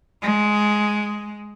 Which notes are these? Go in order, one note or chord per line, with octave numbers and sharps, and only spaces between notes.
G#3